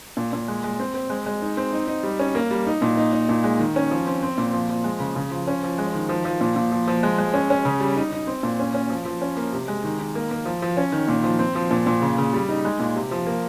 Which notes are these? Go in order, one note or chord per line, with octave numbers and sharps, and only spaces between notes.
A#2
A#2
G#3
G#3
C4
C4
G#3
G#3
D#4
C4
D#4
D#4
G3
C#4
A#3
G3
D#4
A#2
D#4
D#4
A#2
G#3
D#3
C#4
F3
C4
C4
A#2
F3
F3
G#3
C#3
C#3
F3
C#4
F3
G#3
D#3
F3
F3
A#2
A#2
F3
F3
G#3
G#3
C#4
C#4
C#3
G3
D#4
D#4
C4
A#2
C#4
C#4
F3
F3
C#4
A#3
C3
G#3
D#3
D#3
A#3
A#3
F3
F3
C#4
D#3
A#2
F3
C4
F3
A#2
A#2
C#3
C#3
G3
D#4
G#3
A#2
C3
F3
A#3